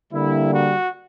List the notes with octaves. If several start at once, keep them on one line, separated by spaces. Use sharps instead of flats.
D3 G3 A#3 E4
F#4